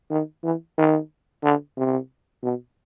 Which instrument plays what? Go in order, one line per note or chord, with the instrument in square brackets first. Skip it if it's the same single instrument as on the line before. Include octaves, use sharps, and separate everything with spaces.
[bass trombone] D#3
E3
D#3
D3
C3
B2